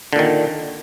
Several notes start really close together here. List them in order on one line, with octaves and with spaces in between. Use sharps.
D3 A#2 D#3